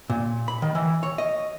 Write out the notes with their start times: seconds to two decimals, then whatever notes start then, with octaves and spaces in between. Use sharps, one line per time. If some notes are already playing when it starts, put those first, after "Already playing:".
0.10 A#2
0.48 B5
0.62 D#3
0.75 E3
1.03 C#5
1.18 D#5